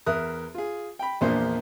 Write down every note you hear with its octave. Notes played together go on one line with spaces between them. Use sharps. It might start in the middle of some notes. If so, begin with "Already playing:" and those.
E2 A#4 E5 D#6 F#6
F4 G#4
G5 B5
A#1 E2 A#2 A#3 D4 C5